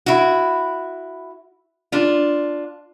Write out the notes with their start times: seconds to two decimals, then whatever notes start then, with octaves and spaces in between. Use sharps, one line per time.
0.06 E4 F#4
1.92 D4 F4